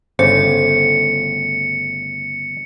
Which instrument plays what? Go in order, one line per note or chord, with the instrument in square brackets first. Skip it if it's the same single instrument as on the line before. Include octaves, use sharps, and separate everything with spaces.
[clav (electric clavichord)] G1 C#3 [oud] A3 [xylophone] C5 [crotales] C#7